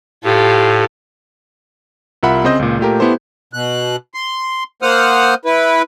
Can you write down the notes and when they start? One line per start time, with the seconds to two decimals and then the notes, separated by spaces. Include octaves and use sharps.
0.24 A2 F4 G4 A4
2.23 C2 F4 A#4 E5 F#5 B5
2.44 C#3 C4 C5 D#5 G6
2.59 C#2 A#2
2.79 A#2 A3 G4 A#4
3.00 B3 E4 G4 A4 C5
3.53 B2 F#6
4.14 C6
4.82 A#3 C5 F#5 D#6 F6
5.45 E4 B4